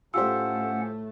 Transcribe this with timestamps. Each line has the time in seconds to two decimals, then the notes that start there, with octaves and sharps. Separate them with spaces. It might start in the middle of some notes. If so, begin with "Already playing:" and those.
0.14 A2 A3 C#4 F4 G4 C5 F#5 E6